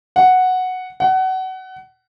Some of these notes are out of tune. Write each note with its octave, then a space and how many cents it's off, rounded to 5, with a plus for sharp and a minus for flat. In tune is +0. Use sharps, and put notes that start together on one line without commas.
F#5 -5
F#5 +25